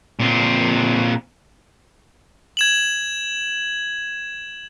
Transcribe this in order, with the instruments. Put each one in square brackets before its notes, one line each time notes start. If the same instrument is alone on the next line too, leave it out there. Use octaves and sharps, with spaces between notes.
[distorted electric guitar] A#2 C4
[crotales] G#6 E7 F#7